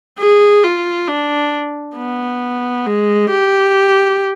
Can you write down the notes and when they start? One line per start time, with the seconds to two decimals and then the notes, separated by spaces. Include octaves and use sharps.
0.19 G#4
0.64 F4
1.08 D4
1.97 B3
2.86 G#3
3.30 G4